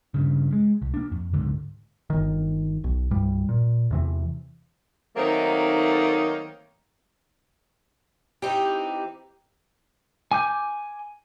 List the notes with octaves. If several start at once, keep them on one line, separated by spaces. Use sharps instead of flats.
G2 C#3
G#3
C2
A#3 D4
F2
C#2 G#2 D3
G1 D#3
B1
C2 G2 G3
A#2
E2 C3 E3
D#3 F#3 A3 A#3 C4 D#4
E3 C4 D#4 G4
G#5 D6 G6